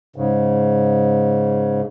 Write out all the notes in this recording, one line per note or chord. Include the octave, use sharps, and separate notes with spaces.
G#2 C#3